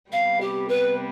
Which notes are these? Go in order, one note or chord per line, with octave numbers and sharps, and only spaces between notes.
C3 G3 B3 F5
G4
B4